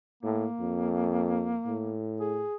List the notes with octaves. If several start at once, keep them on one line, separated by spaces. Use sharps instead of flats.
A2 A#3
F2
A2
G#4